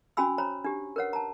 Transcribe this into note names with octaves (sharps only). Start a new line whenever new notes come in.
C#4 F#4 G#5 B5 E6
C5 C#5 A#5 B5
D4 G4
A#4 B4 C#5 F#5
A5 A#5